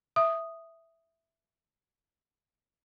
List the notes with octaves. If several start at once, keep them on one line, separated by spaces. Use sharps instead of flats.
E5 D#6